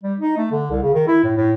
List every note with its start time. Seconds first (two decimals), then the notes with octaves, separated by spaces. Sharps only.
0.03 G3
0.19 D#4
0.37 A3
0.52 D3
0.71 C2
0.82 C#3
0.94 D#3
1.07 E4
1.24 A2
1.37 A2